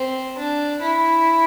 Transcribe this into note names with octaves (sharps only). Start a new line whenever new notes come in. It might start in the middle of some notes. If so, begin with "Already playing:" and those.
Already playing: C4
D4
E4